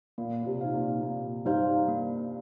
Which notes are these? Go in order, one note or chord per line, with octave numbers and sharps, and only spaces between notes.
A#2 A#3
A#2
C3
D#4 C5 F5
A#2
A#2 A#3
G2 D#4 C5 F5
A#3